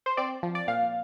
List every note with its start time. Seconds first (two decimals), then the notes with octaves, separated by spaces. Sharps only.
0.06 C5
0.17 C4 D5
0.43 F3
0.55 D5
0.68 A#2 F5